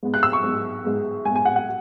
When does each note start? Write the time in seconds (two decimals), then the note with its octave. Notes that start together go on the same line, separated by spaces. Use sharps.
0.03 G#2 G#3 B3
0.14 F#6
0.23 E6
0.33 C#6
0.44 G#2 G#3 B3
0.84 G#2 G#3 B3
1.25 G#2 G#3 B3 G#5
1.36 G#5
1.45 F#5
1.56 F#5